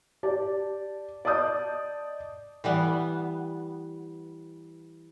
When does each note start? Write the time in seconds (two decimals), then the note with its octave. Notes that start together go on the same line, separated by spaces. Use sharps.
0.23 G4 D5 A5
1.25 D5 D#5 A5 D#6 G6
2.64 E3 G3 B3